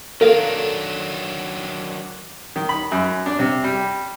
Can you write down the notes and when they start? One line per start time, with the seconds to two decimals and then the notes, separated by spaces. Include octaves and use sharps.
0.21 D#3 F#3 D4 A4 A#4 F5
2.56 D#3
2.69 B5
2.91 F#2
3.26 D4
3.39 C3
3.64 G3